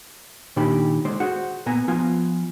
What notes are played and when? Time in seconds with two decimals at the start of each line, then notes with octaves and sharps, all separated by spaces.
0.56 A#2 D#3 D4 G4 G5 B5
1.05 D3 G#3 C5 D5
1.20 F#4 G#4 C5 F#5
1.66 A#2 B3 G#5 A#5
1.88 F3 B3 F4 G#5